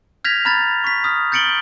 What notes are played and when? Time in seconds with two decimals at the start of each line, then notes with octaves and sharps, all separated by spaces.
0.24 F6 G6 G#6 A#6 B6 F7
0.45 A#5 B5 F6 G#6 A6
0.84 C#6 B6
1.04 D#6 F6
1.32 G6 A6 C#7 D7 F#7 G7